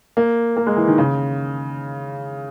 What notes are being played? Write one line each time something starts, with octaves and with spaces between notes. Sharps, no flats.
A#3
A#3
G#3
E3
D#3
C#3